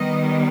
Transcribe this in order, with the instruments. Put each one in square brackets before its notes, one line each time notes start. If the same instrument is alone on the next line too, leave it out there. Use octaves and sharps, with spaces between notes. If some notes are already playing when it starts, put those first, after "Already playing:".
Already playing: [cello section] D#3 G3 B3 D#5